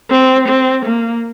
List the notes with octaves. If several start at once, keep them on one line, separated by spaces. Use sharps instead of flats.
C4
C4
A#3